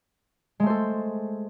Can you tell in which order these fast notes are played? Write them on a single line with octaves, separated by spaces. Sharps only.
G#3 A3 C5 A4